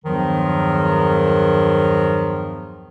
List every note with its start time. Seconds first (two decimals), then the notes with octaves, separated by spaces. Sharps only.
0.04 E2 G2 D#3 F3 F#3